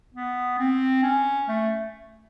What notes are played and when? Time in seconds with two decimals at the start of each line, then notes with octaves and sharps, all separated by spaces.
0.14 B3
0.58 C4
1.03 C#4
1.49 A3